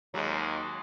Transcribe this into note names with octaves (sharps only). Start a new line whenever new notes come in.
D#2 F#3 G#3